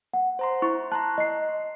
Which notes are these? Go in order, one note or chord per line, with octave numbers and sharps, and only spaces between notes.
F#5
C5 A#5 C6
E4 C#6
A5 A#5 C6 F#6
D#5 C7